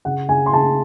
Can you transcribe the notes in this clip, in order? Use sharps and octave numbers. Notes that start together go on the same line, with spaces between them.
C#3 F#5
C#3 G#5
C6
C#3 A5